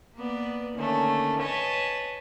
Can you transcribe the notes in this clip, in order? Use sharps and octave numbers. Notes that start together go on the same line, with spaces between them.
A#3 B3 B4 D5
D3 D#3 A3 A#3 C#4
B4 C#5 D#5 G#5 A5